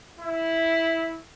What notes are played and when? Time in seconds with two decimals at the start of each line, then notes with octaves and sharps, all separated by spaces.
0.20 E4